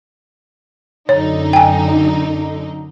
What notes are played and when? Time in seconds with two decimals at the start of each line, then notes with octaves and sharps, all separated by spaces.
1.09 F#2 D3 D#4 C#5
1.53 G5 G#5